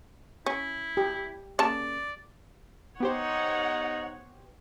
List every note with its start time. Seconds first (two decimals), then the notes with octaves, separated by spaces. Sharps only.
0.46 C#4 E4
0.97 G4
1.59 C#3 A#3 D5 A5
3.00 B3 D#4 G4 C5 C#5 F#5